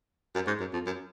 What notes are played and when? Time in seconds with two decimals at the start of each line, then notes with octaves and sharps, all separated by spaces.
0.35 F#2
0.47 G#2
0.60 F#2
0.73 F2
0.86 F#2